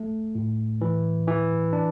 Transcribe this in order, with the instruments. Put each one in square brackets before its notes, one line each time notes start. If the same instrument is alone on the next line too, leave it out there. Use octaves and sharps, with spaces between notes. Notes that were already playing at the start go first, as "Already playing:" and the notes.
Already playing: [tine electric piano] A3
A2
E3
E3
D4